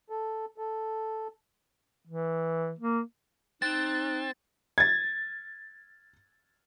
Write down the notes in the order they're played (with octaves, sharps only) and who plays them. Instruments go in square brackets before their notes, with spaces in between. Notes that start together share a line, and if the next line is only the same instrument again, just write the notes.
[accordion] A4
A4
[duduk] E3
A#3
[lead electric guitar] C4 [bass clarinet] D#4 [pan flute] F#6 [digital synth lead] A6
[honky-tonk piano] G#6 A6